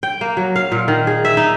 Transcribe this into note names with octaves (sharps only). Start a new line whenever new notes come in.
G5
A#3
F#3
F5
A#2
D#3
G#4
E5
D#4